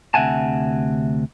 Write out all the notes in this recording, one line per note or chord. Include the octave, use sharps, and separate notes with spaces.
D2 C3 E5 F#5 G#5 A5